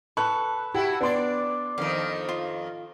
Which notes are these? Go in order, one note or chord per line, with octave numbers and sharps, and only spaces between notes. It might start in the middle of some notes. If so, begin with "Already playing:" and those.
A4 B4 C#6 F#6
E4 F#4 G4
B3 D4 D5 C6
F2 D#3 F3 D#5 F5
F4